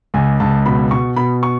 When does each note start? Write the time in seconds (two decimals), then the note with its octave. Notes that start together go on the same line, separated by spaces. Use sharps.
0.14 C#2 G#5
0.40 C#2 A5
0.66 B2 B5
0.91 B2 C#6
1.16 B2 B5
1.43 C#6